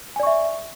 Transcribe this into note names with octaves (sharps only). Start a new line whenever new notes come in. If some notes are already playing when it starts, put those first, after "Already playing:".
D5 E5 G#5 C#6